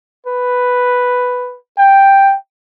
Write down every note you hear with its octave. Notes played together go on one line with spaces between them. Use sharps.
B4
G5